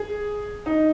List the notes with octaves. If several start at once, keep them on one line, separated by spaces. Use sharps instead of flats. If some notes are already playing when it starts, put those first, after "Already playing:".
Already playing: G#4
D#4